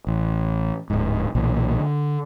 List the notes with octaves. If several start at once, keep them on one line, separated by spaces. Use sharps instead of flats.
A1
D1 G#2
B1 A#2 E3
D3